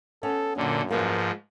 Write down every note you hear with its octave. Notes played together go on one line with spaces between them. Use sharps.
B3 C#4 A4
F#2 A#2 D3
G#2 F3 A#3 B4